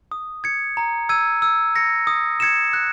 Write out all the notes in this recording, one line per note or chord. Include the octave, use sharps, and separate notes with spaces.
D#6
G#6 C#7
A#5
E6 G#6 D#7
E6
A#6 C#7
D#6
G#6 C#7 E7
F#6